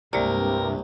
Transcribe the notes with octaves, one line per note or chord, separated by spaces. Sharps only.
C2 G2 C3 G#3 A#3 A#4 D5